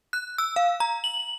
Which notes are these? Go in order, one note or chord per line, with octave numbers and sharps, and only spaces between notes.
F#6
E6
F5
A#5
F#7